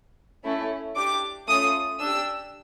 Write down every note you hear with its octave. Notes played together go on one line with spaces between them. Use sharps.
A3 C#4 E4 A4
D4 G4 D6
A3 C#4 F4 D#6
D4 G4 E6